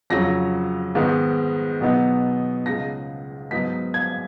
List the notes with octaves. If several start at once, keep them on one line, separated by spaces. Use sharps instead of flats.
F2 C#3 F#3 C#4 A#6
G#2 D#3 G#3 B3 D#4
B2 F#3 B3 D#4
C#2 C#3 G#3 A#6
G#2 F#3 B3 D#4 B6
G#6